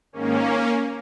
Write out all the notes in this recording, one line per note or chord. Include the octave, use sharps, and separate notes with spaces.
G#2 D#3 A#3 C#4